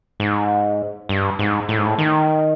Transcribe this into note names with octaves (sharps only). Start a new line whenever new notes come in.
G#2
G2
G#2
A2
G#2
A2
D#3